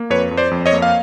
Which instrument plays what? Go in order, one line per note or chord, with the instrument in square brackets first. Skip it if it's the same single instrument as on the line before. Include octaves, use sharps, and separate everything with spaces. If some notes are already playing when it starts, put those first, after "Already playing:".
Already playing: [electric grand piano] A#3
F2 B4 C#5
F2
C5 D5
F2
C#5 D#5
A#3
F5